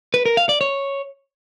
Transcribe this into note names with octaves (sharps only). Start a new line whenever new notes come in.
B4
A#4
F5
D5
C#5